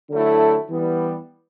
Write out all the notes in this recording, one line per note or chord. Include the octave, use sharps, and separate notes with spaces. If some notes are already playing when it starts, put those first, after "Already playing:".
D3 F#3 A3 E4 A4
E3 G3 B3